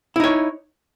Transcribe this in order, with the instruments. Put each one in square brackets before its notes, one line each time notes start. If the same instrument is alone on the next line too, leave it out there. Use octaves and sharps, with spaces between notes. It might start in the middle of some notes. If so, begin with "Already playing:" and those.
[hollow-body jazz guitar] E4
D#4
C#5